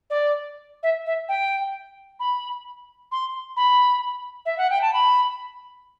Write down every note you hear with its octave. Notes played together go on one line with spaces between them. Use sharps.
D5
E5
E5
G5
B5
C6
B5
E5
F#5
G5
A5
B5